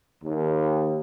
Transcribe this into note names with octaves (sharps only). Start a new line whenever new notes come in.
D#2